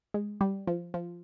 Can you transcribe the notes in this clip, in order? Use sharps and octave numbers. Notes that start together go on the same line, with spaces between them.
G#3
G3
F3
F3